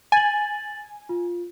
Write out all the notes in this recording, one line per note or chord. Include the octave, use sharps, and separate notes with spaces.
G#5 A6 F#7
F4